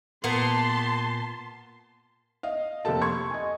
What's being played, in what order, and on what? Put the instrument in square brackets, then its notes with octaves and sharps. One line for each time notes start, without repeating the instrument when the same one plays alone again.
[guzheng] A#2 B3 [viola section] A5 C6
[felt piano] D#5 F5
F1 A#3 G4 A4 A5
C6 C#6 G#6
D#5 G#5